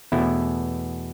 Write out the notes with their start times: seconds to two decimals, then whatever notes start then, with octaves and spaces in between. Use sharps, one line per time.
0.12 E2 B2 A3 E4